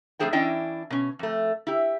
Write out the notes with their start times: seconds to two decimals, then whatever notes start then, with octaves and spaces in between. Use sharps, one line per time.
0.19 F2 A3 D4 G#4 C5 G5
0.33 E3 C#4 D4 E4 D#5 G5
0.90 B2 C#4
1.19 F2 A3
1.67 E4 G4